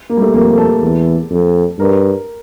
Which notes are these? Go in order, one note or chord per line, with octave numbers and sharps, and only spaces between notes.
A#3
G3
A3
F2 A#3
A#3
A4
A4
E2
F2
G2 A#4